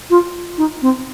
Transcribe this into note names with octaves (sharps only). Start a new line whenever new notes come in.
F4
D#4
C4